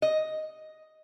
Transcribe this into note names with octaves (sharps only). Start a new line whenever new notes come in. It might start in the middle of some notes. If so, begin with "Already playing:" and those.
D#5